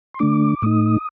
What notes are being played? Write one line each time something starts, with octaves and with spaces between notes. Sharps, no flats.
C6
D3 A3 D4 D6
A2 A3 D#4 D#6